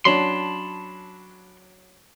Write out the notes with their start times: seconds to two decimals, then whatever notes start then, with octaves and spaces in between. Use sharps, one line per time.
0.05 F#3 C#4 D4 A5 B5 C6